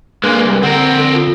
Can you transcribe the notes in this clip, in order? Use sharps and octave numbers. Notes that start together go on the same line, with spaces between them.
G#3 A#3 D4 B4
C2
D3 C4 A#4 F#5
A4
F4